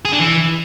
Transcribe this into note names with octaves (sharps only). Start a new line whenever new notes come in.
G#4
D4
E3